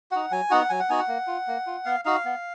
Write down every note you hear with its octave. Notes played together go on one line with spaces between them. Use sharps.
D#4 F#4 F#5
F#3 G#5
B3 D#4 F#4 F#5
F#3 G#5
F#5
B3 D#4 F#4 G#5
F#5
A#3
F4
A#3
F4
B3 F5
D#4 F#4 F5
B3